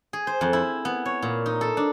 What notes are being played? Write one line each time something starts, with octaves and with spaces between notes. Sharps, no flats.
G#4
C5
F2
E4
B3
C#5
A#2
D#4
A4
D4